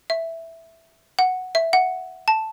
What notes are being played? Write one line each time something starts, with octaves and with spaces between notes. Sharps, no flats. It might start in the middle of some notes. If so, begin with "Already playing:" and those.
E5
F#5
E5
F#5
A5